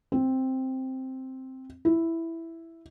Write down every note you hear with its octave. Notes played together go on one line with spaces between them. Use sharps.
C4
E4